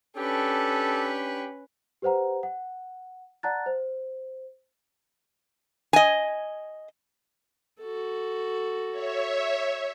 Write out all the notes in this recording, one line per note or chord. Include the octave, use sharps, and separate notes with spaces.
C#4 D4 G4 A4 B4
G4 B4 C5 F#5 A#5
F#5
D5 F#5 A5 A#5 F#6 A6
C5
D#5 G#5
F#4 A4
C#5 E5